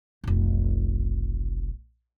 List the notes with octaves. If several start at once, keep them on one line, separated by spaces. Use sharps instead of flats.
F1 B1